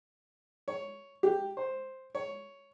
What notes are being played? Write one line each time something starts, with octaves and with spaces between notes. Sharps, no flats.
C#5
G4
C5
C#5